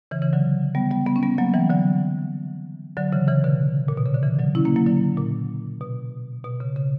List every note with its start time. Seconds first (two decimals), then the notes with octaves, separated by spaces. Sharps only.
0.11 C#3 E3
0.22 C#3 E3
0.33 D3 F#3
0.75 G3 B3
0.91 G3 B3
1.06 G3 B3
1.16 C#4
1.23 G3 B3
1.38 F#3 A#3
1.54 E3 G3
1.70 D3 F#3
2.97 D3 F#3
3.12 C#3 E3
3.28 C#3 E3
3.44 B2 D3
3.88 A#2
3.97 B2
4.06 C#3
4.15 D3
4.23 C#3 E3
4.39 D3 F#3
4.55 C#4 E4
4.65 A#3 C#4
4.76 F#3 A#3
4.86 D3 F#3
5.17 A#2
5.81 B2
6.44 B2
6.60 C#3
6.76 C#3